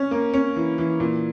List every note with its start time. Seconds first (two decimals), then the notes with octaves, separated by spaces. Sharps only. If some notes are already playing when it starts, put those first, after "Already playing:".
Already playing: C#4
0.11 A#3
0.34 C#4
0.56 E3
0.78 E3
1.00 A#2